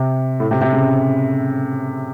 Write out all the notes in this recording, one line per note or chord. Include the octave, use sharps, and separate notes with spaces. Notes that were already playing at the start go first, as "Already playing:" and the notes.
Already playing: C3
A2
C3
C3
C#3